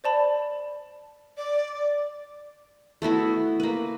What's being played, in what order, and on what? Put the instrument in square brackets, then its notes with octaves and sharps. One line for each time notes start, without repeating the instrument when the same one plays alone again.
[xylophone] C5 D5 A5 B5
[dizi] D5
[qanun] A3 B3 E4 F#4
A#3 B4